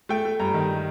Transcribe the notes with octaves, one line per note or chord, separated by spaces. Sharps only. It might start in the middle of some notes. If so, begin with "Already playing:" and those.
A3 G5
A3
G2 A#5
D#3